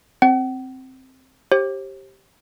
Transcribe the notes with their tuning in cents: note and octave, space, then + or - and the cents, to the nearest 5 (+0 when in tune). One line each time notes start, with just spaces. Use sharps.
C4 +0 F#5 +40
G4 -5 C5 +40